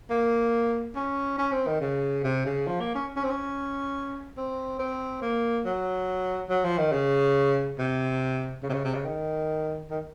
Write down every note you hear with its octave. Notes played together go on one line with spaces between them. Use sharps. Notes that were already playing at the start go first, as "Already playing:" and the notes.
A#3
C#4
C#4
C4
D#3
C#3
C3
C#3
F3
A#3
C#4
C#4
C4
C#4
C4
C4
A#3
F#3
F#3
F3
D#3
C#3
C3
C#3
C3
C#3
C3
C#3
D#3
D#3